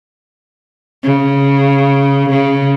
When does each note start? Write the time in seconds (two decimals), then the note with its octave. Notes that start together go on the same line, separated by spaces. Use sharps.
1.04 C#3
2.30 C#3